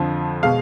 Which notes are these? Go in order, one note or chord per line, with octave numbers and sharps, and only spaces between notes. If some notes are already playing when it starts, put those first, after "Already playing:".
Already playing: F2 D3 F3
B2 G#3 F5